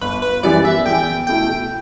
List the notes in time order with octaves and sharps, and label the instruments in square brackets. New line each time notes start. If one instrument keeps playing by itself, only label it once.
[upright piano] G1 [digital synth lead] B4
[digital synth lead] B4
[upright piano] F#2 E3 G3 B3 [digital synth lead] D5
[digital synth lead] E5
[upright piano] E2 [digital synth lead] G5
[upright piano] B2 A3 E4 [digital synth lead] G5